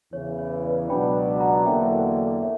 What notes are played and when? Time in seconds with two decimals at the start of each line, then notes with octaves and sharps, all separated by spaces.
0.13 E2 C#3 E3 C#5
0.39 C#5
0.64 B4 D5
0.90 C#2 B2 F#3 B3 D4 G5 B5
1.40 F#5 A#5
1.65 E2 D3 F#3 A#3 E5 G5
2.42 C#5 E5